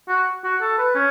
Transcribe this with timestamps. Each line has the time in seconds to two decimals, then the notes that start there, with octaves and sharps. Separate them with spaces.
0.08 F#4
0.44 F#4
0.61 A4
0.78 B4
0.95 C#4